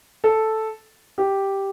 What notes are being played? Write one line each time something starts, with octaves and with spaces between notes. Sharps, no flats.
A4
G4